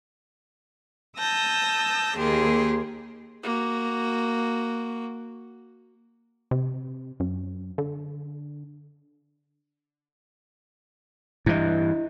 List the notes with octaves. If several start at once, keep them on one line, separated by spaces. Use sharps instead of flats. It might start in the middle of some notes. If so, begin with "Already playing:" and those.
A5 D#6 E6 G6 A#6
D#2 A#3 G4 G#4 C6
A#3 F#4
C3
F#2
D3
G2 E3 E4 D#5